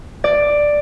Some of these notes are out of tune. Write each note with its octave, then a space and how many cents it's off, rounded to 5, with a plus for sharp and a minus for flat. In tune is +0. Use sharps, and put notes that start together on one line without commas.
D5 +5